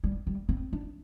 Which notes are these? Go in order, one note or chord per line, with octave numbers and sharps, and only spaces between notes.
G3
G3
C4
D4